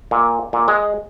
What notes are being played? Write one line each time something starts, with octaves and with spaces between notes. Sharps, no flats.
A#2
A#2
G#3